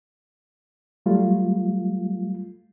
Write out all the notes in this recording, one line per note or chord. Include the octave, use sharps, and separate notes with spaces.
F#3 G3 A3 F4